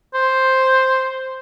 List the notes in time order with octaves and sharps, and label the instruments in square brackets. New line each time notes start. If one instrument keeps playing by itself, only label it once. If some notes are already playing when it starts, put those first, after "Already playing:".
[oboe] C5